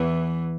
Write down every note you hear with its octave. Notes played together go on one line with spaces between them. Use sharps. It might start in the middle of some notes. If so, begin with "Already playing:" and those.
Already playing: E2 E3